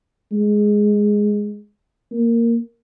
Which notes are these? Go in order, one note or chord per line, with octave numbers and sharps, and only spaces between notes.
G#3
A#3